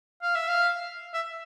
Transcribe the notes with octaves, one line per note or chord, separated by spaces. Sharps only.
F5
E5
F5
E5